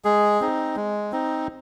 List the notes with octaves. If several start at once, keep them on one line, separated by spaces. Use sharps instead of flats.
G#3 G#4
C4 D#4
G#3
C4 D#4